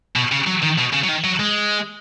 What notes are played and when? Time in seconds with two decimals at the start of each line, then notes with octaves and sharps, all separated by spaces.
0.16 B2
0.31 C#3
0.47 F#3
0.62 D#3
0.78 B2
0.93 C#3
1.04 F#3
1.08 D#3
1.24 F#3
1.40 G#3